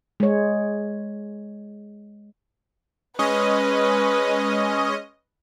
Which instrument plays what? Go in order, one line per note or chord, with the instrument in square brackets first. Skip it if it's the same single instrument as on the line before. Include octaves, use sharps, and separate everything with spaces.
[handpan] G#3 C#5
[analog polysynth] G#3 C#4 D#5 [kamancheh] B4